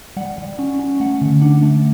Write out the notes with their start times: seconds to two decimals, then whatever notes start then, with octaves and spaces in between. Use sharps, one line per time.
0.17 G3 F#5
0.38 G3
0.59 C#4
0.79 C#4
1.00 A3 F#5
1.21 D3
1.41 D4 F#5
1.62 A3